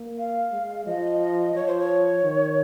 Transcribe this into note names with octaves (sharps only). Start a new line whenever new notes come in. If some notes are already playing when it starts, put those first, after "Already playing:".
Already playing: A#3
F5
G#3
F3 D#5
F3 C#5
C5
C#5
D#3